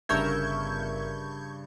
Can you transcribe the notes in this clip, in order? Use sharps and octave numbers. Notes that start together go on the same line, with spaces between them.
G1 G2 C#3 A#4 E5 C#6 G6 G#6